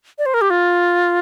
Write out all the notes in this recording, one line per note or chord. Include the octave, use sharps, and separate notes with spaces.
D5
C5
A#4
G4
F4